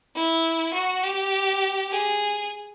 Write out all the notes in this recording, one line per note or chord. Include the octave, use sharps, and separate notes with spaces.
E4
F#4
G4
G#4